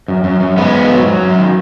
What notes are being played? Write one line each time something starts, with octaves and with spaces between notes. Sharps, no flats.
F#2
F#2
F#2
G#2 G#3 B3
G#2
F#3
F#3
F#2
D#3